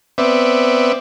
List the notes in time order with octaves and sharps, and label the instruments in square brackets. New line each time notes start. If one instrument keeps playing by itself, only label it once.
[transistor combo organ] B3 C4 D5 E5